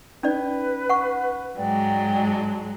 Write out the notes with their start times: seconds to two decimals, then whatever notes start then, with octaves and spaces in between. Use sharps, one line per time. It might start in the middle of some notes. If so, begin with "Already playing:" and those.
0.23 C#4 D#4 B4 D5
0.89 F#5 C#6
1.56 G#2 F#3 G#3 D5 G5
2.27 A5